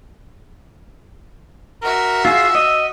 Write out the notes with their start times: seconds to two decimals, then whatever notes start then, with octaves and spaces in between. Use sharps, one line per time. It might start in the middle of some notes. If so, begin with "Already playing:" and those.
1.82 F#4 A#4 E5
2.25 F4 G#4 E6
2.55 D#5